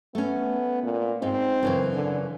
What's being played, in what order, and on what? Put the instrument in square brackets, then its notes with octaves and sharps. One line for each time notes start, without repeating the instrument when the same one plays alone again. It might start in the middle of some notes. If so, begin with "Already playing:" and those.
[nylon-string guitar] A3 C#4 [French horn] B3
[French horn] A#2
[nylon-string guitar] G#2 D#4 [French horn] C4
[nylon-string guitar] F#2 C#3 E3
[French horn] D3